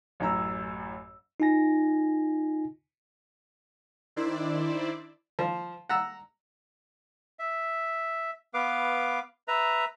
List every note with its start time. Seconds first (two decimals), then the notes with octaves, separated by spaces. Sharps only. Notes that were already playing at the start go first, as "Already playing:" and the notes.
0.20 A1 F#2 A2 A#5 E6
1.40 D#4 F4 G#5 A#6
4.16 D#3 D4 E4 C5 D5
5.39 F3
5.89 F#5 A#5 E6
7.39 E5
8.54 B3 B4 F5 D6
9.48 B4 E5 A#5